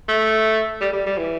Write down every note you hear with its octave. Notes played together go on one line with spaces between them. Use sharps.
A3
G3
G3
G3
E3